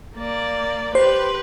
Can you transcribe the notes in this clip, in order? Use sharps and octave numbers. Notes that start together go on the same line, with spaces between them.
A#3 D5
G4 B4 C5